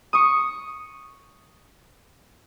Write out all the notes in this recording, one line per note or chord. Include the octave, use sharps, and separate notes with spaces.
C#6 D#6